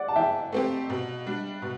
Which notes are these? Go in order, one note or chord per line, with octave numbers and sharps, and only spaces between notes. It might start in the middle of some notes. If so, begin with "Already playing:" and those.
Already playing: D5 F#5
A5
E3 E5 G5
A3 C4 G4
B2
G3 D4
B2